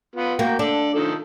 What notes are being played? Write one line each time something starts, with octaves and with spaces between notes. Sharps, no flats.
B3 F4
A#3 F#4 G5
D4 A4 D5
D#3 F3 A4